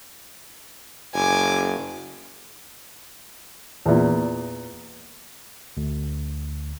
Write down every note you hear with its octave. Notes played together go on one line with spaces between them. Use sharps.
F#1 G#5 D6
E2 A#2
D2